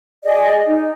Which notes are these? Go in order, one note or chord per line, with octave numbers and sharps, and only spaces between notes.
G#4 D5 D#5
D#4